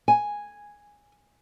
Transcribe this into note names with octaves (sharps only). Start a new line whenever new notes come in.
G#5